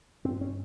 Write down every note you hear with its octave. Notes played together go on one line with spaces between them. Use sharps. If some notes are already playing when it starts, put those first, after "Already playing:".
G2 C4
C#4